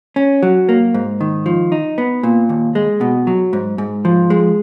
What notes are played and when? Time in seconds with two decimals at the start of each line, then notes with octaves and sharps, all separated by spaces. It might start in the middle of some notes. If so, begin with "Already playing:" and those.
0.16 C#4
0.43 F#3
0.69 A#3
0.94 G#2
1.21 D#3
1.46 F3
1.72 D#4
1.98 B3
2.23 A#2
2.49 D#2
2.75 G#3
3.01 B2
3.27 F#3
3.53 G#2
3.78 G#2
4.05 F3
4.30 G#3